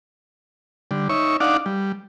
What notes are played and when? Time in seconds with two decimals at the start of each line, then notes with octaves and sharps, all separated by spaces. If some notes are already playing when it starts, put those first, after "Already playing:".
0.91 D3 G3
1.09 D#4 C#5 E5 C#6
1.40 D4 D#4 D5 F5 F#5
1.66 G3